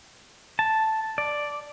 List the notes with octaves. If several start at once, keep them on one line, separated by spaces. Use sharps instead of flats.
A5
D5